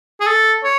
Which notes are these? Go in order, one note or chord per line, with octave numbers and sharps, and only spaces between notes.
G#4
A4
C#5